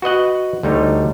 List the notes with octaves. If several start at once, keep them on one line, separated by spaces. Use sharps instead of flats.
F#4 B4 D#5 F#5
D2 G3 A3 D#4 C#5